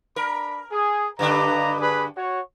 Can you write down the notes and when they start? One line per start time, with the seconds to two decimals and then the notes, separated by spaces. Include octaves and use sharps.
0.16 D4 A#4 B5
0.71 G#4
1.19 G2 D3 D4 B4 D#5 A#5
1.80 G#4 B4
2.16 F#4 C#5